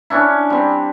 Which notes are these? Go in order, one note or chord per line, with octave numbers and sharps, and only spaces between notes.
C#4 D4 E4
G3 C4